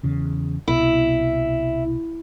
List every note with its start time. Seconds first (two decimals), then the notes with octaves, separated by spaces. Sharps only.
0.03 E2 C#3
0.68 C2 B2 E4